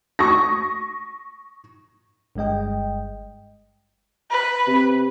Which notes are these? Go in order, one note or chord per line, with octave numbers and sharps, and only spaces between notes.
C#6 D#6 A#6
G1 G2 G#3 D#5 G5
B4
C3